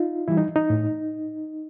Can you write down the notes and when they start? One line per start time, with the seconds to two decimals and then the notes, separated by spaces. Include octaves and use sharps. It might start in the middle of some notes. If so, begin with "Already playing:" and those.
Already playing: D#4 F4
0.28 E3 G3 E4
0.37 D#4
0.56 D#4
0.70 A2